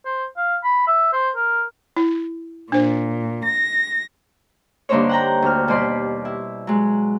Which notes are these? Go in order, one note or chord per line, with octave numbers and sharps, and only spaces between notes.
C5
F5
B5
E5
C5
A#4
E4
A#2 D4 C5
A#6
G2 D3 A#3 D#4 C5 C#5
F#5 G5 A#5
D2 F6
D#2 B2 G3 D5 C6
E4
F#3 G#3